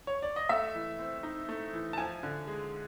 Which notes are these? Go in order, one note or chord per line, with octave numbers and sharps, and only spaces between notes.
C#5
D5
D#5
A3 E5
E3
C4
D#4
A3
E3
A5
F3 G#5
D3
G#3